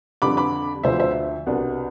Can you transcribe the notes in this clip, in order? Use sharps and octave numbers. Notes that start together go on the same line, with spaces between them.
F2 D3 G3 D4 B5 D6
B5 D6
D2 D3 F3 C5 E5
C5 E5
C2 B2 B3 D4